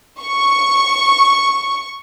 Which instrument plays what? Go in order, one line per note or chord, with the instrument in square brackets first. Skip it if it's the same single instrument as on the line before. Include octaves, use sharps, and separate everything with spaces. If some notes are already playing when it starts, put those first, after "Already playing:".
[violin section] C#6